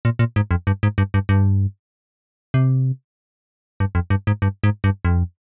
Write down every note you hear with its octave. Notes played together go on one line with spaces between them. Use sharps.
A#2
A#2
G#2
F2
G2
G#2
G2
G2
G2
C3
G2
F2
G2
G#2
G2
G#2
G2
F2